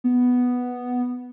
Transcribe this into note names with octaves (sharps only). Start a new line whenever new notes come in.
B3